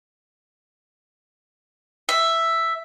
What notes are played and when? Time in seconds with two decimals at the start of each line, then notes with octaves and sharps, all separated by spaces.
2.09 E5